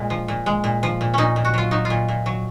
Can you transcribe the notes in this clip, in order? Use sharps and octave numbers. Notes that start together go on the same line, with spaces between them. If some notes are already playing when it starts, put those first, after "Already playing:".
Already playing: A#2 G#3
F3
A#2
G#3
A#2
F3
A#2
A#2 C#4 D#4
A#2
F#4
F#3 F4
F#3 D#4
F4
A#2
A#2
F#3